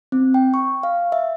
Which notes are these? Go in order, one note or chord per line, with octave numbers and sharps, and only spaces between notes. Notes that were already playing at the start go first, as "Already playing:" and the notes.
C4
G5
C#6
F5
E5